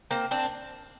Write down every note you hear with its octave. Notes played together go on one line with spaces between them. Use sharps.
A#3 C4
C4 D4